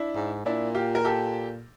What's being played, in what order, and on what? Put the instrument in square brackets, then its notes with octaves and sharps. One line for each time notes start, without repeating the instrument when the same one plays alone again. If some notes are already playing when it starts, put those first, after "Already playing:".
Already playing: [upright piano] D4 E4
[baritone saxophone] G#2
[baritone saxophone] A#2 [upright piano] D4 E4
[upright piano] F4 G4
A#4
G4 A4